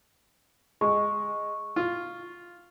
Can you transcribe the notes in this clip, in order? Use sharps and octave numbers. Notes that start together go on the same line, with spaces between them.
G#3 C#6
F4